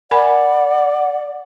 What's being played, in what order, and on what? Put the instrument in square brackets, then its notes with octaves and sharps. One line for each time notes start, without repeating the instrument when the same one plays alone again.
[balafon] A#4 G#5 B5 [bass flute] D5 [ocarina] F#5